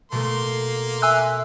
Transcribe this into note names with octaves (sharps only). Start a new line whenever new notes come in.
B2 A3 A#3 C6
E5 G#5 E6 F#6